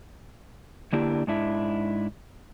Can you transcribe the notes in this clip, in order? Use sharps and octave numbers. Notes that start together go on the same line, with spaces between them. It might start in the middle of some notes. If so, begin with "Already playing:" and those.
D3 A#3 D4 E4 G4
G#2 D4 E4